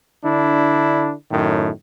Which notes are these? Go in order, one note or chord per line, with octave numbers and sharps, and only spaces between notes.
D3 D4 E4
F#2 A2 D#3